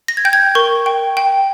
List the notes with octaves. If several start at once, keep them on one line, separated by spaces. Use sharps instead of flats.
A#6
G#6
G5 G6
G#6
A#4 C#6
G5
G5